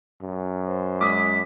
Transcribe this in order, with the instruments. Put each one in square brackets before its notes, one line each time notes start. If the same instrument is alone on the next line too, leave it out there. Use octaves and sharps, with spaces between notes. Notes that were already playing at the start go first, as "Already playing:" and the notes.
[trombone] F#2
[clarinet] C5
[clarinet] G#3 [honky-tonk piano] D6 D#6 [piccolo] B6